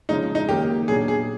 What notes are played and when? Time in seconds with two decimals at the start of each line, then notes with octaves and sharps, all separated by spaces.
0.09 C#3 F3 G#3 C#4 D#4
0.35 D#4
0.49 D#3 F#3 A#3 D#4 G4
0.88 A#2 F#3 B3 D4 G4 G#4
1.08 G#4